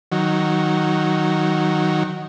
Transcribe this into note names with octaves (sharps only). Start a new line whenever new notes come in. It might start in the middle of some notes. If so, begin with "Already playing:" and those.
D#3 F#3